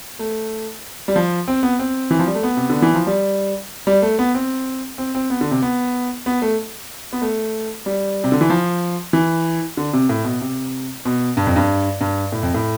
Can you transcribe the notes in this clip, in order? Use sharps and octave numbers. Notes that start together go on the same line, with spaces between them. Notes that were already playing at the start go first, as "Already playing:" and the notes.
A3
G3
F3
C4
B3
C4
E3
F3
G3
A3
B3
C3
D3
E3
F3
G3
G3
A3
B3
C4
C4
C4
B3
D3
C3
B3
B3
A3
B3
A3
G3
C3
D3
E3
F3
E3
D3
C3
A2
B2
C3
B2
G2
F2
G2
G2
A2
F2
A2